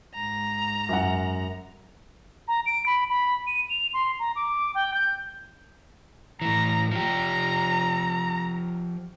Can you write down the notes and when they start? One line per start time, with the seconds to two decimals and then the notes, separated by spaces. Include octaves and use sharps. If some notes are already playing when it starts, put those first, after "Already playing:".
0.14 G#2 A#5
0.89 F#2 E5 F#5
2.48 A#5
2.66 D7
2.86 B5
3.09 B5
3.47 D#7
3.70 F7
3.94 C6
4.19 A#5
4.36 D6
4.75 G5
4.94 G6
6.42 A2 E3 A#5
6.91 F3 G4 A#5